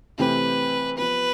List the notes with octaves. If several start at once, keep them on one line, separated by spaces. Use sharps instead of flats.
C3 E3 A3 C4 G4 B4
F3 B3 F4 B4